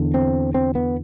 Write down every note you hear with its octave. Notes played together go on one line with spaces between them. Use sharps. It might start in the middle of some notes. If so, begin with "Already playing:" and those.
Already playing: E2 D3
C4
C4
B3